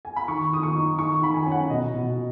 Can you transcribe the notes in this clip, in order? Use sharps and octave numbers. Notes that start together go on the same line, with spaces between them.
G#5
B5
D#3 C#6
D#3 D#6
C#6
D#4
D#3 C#6
D#3 B5
G#5
C#4 G#5
F#5
B2 D#5
B2